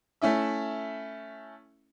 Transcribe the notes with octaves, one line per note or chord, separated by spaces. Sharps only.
A3 C#4 E4 E5